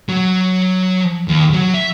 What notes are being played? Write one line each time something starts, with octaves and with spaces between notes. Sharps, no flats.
F#3
D#2
F#3
E5